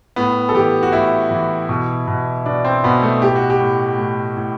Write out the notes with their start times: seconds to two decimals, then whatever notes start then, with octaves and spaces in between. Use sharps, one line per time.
0.16 A2 B3
0.49 A4
0.54 E3 G4
0.83 F#4
0.93 A2 E4
1.31 E3
1.69 B2
2.08 B2
2.46 B2 D4
2.64 C4
2.84 B2 B3
3.02 A3
3.22 A2 G4
3.36 F#4
3.50 G4
3.60 A2
3.98 A2
4.37 A2